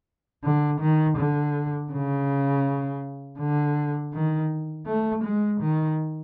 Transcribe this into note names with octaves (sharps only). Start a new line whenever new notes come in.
D3
D#3
D3
C#3
D3
D#3
A3
G#3
D#3